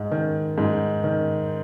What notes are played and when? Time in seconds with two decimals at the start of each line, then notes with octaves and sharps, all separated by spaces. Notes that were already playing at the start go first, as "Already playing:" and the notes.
Already playing: G#2
0.11 D#3
0.58 G#2
1.04 D#3